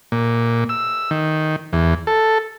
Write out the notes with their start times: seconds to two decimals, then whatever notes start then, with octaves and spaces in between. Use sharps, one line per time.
0.12 A#2
0.69 E6
1.11 D#3
1.73 E2
2.07 A4